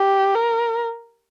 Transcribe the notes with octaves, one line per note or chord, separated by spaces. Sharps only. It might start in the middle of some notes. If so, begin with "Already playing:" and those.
Already playing: G4
A#4